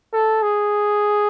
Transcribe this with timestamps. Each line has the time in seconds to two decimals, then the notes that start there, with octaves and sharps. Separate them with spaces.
0.13 A4
0.42 G#4